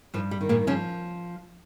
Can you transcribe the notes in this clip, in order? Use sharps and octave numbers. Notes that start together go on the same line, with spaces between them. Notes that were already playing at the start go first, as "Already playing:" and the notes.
G2 F3
G3
D#3
A#2 A#3
C#3 F3 C#4